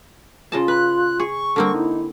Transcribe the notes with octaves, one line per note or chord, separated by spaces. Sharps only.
C#3 F4 D#5 A5
B4 F#6
G#4 C#6
D3 G3 A#3 C4
D#4 E4